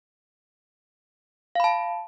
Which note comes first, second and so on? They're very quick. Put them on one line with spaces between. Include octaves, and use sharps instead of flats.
F5 B5 A5